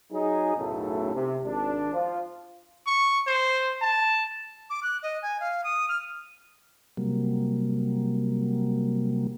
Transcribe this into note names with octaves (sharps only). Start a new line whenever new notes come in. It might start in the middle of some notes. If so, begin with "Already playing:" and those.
F#3 D#4 G#4
B1 F#2 A2 C#3 A3 A4
C3
G#1 D4
F3 F4
C#6
C5
A5
D6
F#6
D#5
G#5
F5
D#6
F6
C3 F#3 G3 A#3